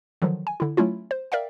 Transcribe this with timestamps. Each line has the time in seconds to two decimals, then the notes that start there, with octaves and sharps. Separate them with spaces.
0.22 D3 D#3 F3 F#3
0.47 G#5
0.60 D3 E4
0.77 F#3 A3 C#4 E4 F4
1.11 C5
1.32 A#4 D5 E5 F5 G5